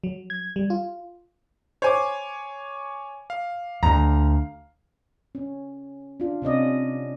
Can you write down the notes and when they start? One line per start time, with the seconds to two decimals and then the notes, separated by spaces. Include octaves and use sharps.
0.04 F#3
0.30 G#6
0.56 G3
0.70 F4
1.82 C5 C#5 G#5 D6
3.30 F5
3.83 D2 A#5
5.35 C#4
6.20 D4 F4
6.42 C3 C#4 D5 D#5